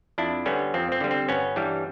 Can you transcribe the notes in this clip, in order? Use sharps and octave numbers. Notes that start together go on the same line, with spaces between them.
F2 D4 E4
D3 G3 B3 C#4
F2 C4
C4
D3 G3
C4
G1 B3 C#4
G2 E3 G3